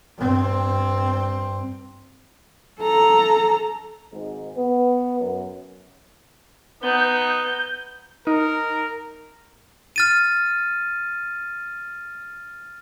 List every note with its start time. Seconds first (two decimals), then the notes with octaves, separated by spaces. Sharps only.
0.18 G2 C4
2.80 A4 A#5
4.11 G#1 G#2
4.56 B3
5.20 F#2
6.83 B3 D#4 G6
8.27 D#4 A#4
9.96 F6 A6 D#7